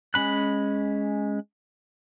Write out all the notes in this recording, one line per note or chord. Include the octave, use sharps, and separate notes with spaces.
G#3 C#4 B5 F#6